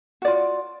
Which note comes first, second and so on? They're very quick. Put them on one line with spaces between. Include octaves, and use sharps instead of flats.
F#4 D5 F4